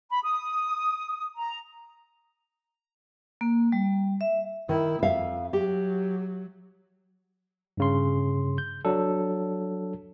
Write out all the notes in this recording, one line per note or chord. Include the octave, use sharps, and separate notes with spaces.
B5
D#6
A#5
A#3
G3
E5
D#3 E4
F2 E5 F5
F#3 G4
G2 C#3 C6
G6
F#3 D4 A4